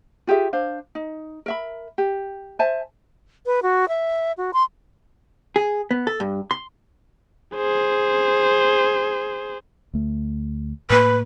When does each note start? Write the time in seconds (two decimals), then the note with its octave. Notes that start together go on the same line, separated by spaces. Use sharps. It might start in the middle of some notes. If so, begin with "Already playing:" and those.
0.27 F4 G4 G#4 E5
0.53 D4 C5 F5
0.95 D#4
1.46 A#4 E5 B5
1.98 G4
2.59 C5 E5 G#5 A5
3.46 B4
3.63 F#4
3.88 E5
4.37 F#4
4.53 C6
5.56 G#4
5.91 B3
6.07 A4
6.20 G2
6.51 C6
7.55 G#4 C5
9.94 D2 A3
10.90 A2 A#3 B4